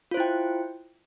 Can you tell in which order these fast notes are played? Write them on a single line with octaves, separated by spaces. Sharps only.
F4 C5 E4 G5